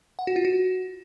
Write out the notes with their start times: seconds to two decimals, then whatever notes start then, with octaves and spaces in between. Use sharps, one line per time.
0.19 F#5
0.27 F#4
0.36 F4
0.45 F#4